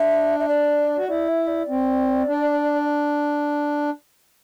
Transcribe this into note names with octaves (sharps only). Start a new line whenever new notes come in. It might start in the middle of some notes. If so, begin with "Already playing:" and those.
Already playing: D4 E5
E5
D5
F#4
E4 D5
E5
D5
C4
D4